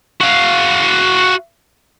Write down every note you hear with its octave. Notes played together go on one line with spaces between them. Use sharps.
F#4 F5